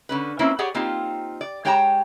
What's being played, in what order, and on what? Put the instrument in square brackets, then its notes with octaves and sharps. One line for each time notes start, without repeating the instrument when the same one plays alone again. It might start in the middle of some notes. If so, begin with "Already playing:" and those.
[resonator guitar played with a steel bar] D3 C#4 B4
A#3 C4 C#4 E4 E5
G4 G#4 C#5 D5 F#5
A#3 C4 D#4 F4 G4
D5
G#3 G4 C#5 G5 A5 A#5